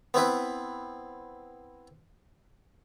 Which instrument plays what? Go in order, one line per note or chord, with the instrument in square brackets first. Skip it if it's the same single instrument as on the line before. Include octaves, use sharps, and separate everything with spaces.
[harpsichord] B3 C4 E4 B4